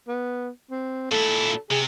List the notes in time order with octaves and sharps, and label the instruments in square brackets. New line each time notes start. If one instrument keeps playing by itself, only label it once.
[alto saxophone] B3
C4
[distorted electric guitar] A#2 E4 [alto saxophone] A4
[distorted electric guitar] C3 [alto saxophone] G#4